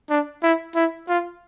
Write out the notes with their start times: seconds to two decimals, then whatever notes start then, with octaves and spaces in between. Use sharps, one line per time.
0.10 D4
0.43 E4
0.75 E4
1.08 F4